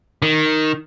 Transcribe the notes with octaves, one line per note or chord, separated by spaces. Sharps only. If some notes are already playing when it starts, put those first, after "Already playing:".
D#3